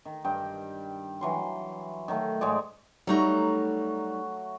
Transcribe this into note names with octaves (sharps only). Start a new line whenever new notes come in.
D#3
G2 G5
E3 F#3 C6
D#3 F#3 A3
G#2 G#3 C#5 D5
F#3 G3 A3 D#4 F#4 A#5